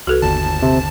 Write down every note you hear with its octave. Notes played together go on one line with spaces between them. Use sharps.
C2 F#4 A4 B4
G1 D#2 D3 A5
C3